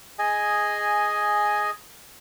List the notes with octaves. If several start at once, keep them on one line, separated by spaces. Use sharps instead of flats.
G#4 D#5 G#5